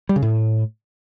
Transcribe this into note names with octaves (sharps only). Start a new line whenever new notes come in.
G3
C#3
A2